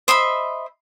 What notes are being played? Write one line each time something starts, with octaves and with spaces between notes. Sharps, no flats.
C5 D#5 E5 B5